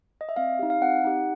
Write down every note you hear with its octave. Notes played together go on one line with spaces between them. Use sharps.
D#5
E5
C4 F5
D#4 G4
F5
C4 F#5
D#4 G4